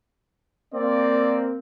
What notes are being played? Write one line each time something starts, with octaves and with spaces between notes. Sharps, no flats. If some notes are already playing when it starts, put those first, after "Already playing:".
A#3 C4 D5